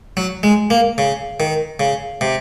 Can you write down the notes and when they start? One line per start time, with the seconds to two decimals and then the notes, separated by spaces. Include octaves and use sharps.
0.17 F#3
0.43 G#3
0.70 A#3
0.98 C#3
1.40 D#3
1.80 C#3
2.21 C3